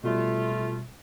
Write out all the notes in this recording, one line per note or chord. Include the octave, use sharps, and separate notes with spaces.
B2 G3 A3 F4